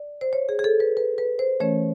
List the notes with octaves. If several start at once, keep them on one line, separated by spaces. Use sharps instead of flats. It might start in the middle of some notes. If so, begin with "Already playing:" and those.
Already playing: D5
C5
C#5
G#4
G#4
A4
B4
B4
B4
C5
E3 A3 C#4 C#5